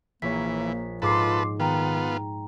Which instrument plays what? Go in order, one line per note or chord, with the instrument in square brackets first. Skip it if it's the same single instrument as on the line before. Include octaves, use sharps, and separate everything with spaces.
[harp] A#1 C#5 [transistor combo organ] E3 [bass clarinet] A#3 [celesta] B6
[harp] G#2 [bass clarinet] F4 [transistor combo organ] A4 B4 [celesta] C6 D6 C7
[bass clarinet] D#3 [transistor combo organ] B3 F4 [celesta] G5 A#5